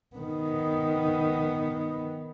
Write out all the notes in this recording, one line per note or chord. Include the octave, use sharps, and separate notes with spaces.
D#3 B3